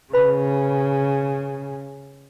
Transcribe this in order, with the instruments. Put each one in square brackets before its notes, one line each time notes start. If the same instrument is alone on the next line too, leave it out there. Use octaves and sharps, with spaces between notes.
[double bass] C#3 [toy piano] B4 B5